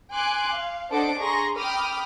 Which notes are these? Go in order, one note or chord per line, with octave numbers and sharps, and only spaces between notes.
G#5 C6 D6 F#6
F5
D4 A4 C5 D#5 F#5 D6
G#4 A#5 C6 C#6 A#6
G5 B5 D6 D#6 F6